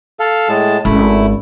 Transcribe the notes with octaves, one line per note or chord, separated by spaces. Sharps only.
A4 F5
A2 G#3 A5
G#1 A3 C#4 E4